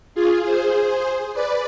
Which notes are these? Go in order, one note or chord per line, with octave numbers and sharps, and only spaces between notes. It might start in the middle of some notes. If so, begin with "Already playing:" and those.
F4 G#4
G#4 C5
B4 D5